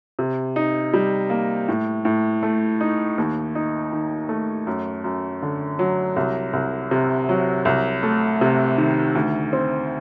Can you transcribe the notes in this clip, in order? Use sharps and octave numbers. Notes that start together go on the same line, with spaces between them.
C3
D#4
G3
A#3
A2
A2
A3
D#4
D#2
D#4
D#3
A3
F#2
F#2
D3
F#3
C2
C2
C3
F#3
C2
A3
C3
D#3
D2
C4